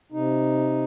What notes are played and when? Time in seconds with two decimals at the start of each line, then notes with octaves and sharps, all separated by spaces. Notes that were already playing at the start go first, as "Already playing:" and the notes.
0.12 C3 D#4